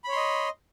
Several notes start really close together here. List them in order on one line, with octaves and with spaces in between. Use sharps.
B5 C#5 C6 D#5